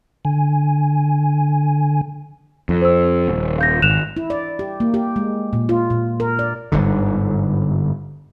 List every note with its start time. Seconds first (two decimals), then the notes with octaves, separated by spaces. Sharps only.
0.25 D3 G#5
2.69 F2
2.82 C5 E6
3.28 D#1
3.58 F5 G6 A#6
3.82 G#1 F#6 E7 F7
4.17 E4
4.30 D5
4.59 G4
4.80 A#3
4.94 G4
5.16 G#3
5.53 A#2
5.69 F4
5.90 A#2
6.20 A#4
6.39 D5
6.72 G1 G#2 D3